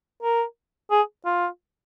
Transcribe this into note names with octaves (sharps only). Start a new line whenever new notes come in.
A#4
G#4
F4